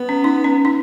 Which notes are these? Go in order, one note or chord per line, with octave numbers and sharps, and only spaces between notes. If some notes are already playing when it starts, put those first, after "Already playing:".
Already playing: B3
C#4
D#4
C#4
D#4